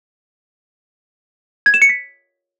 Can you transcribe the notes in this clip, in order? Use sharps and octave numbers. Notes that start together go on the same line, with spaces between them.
G#6
E7
C#7
B6